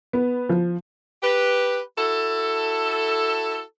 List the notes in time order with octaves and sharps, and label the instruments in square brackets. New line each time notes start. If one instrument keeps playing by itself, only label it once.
[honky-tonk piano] B3
F3
[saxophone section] G4 B4
E4 F#4 A4